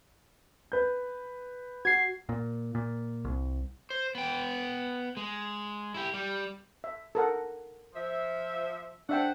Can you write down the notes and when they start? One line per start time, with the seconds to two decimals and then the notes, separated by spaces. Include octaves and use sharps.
0.72 B4 G6
1.85 F#4 G#6 C7
2.29 A#2
2.75 A#2
3.25 C2
3.90 C5
4.15 B3 G5
5.17 G#3
5.94 E4 G4
6.14 G3
6.84 E5
7.15 A4 A#4 F#5
7.95 F3 E5
9.09 D4 A4 C5 E5 F#5 G5